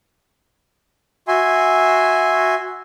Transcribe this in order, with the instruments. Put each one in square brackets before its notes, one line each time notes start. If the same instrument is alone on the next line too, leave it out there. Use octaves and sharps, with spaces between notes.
[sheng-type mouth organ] F#4 E5 G#5 C6